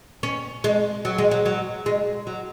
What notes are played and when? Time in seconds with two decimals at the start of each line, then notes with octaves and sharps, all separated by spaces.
0.23 C#4
0.64 G#3
1.05 F#3
1.18 G#3
1.31 F#3
1.46 F#3
1.86 G#3
2.27 F#3